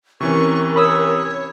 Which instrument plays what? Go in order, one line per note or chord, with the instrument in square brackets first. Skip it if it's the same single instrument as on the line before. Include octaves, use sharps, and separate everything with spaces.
[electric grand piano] C3 E3 C#4 [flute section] A#4 [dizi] C#6
[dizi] C#5 [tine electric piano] B5 D#6 E6